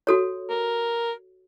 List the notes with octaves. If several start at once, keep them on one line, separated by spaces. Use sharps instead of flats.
F#4 A4 C#5
A#4